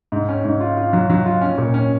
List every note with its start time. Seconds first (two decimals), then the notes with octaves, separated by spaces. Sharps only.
0.12 G#2
0.29 C#4
0.45 G#2
0.60 F4
0.77 F4
0.93 F#3
1.10 F#3
1.26 F4
1.41 C#4
1.58 A#2
1.74 C#4